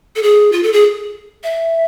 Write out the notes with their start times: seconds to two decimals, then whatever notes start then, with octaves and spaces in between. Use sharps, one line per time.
0.16 A4
0.23 G#4
0.52 F4
0.63 A4
0.73 G#4
1.44 E5